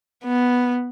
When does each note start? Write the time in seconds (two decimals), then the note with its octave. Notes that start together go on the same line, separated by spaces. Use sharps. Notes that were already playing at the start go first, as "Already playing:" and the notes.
0.24 B3